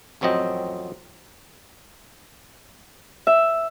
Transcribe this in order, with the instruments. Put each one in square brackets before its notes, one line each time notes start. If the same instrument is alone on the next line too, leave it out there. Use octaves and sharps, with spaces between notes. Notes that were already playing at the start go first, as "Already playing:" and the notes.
[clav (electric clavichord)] A1 F2 F#3 C4 D#5 G5
[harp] E5